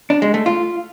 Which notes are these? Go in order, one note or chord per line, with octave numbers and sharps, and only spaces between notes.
D4
G#3
A3
F4